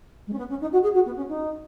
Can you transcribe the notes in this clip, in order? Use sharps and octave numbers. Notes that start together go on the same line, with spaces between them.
G#3
C#4
B3
C#4
D#4
F#4
G#4
F#4
B3
C#4
D#4